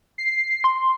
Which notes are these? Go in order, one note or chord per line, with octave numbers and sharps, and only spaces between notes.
C7
C6